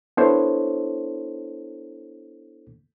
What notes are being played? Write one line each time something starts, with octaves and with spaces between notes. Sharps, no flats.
B3 D4 E4 A4 C5 C#5